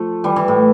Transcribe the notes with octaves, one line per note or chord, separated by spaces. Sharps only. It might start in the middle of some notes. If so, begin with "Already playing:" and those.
Already playing: F3 A3
E3 G3
E3
A2